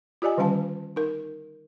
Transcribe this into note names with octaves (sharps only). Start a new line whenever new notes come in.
F4 G4 D5 D#5 G#5
D3 D#3 G3 C#4 F5 A5
D#4 A#4